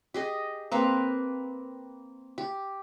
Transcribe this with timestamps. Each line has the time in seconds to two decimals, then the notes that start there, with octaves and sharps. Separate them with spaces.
0.14 G4 G#4 D#5
0.72 A#3 C4 B4 F5
2.38 G4